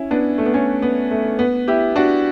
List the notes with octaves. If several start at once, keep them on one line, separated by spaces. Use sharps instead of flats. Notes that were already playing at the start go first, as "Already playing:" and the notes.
Already playing: C#4 E4
B3 D4
A3
B3
A3 C#4
B3
A3
B3
E4 G4
D4 F#4